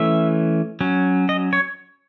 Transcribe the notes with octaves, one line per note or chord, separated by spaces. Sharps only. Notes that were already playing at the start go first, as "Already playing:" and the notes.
Already playing: E3 A3 C#4 E5
F#3 C#4
D#5
C#5